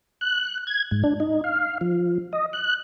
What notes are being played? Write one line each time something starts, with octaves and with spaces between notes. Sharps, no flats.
F#6
G#6
G#2
D4
D#4
F5
F3
D#5
F#6